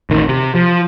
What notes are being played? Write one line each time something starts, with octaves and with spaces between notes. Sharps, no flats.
A1 D#3
C3
F3